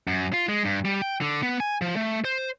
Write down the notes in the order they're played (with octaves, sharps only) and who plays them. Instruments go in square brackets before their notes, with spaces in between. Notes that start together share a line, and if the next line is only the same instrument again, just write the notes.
[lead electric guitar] F#2
F4
G#3
G2
G3
G5
D3
B3
G#5
F3
A3
C5